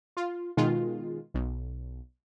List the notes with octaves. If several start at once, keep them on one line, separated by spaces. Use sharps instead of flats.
F4
B2 D#3 G#3 F4
B1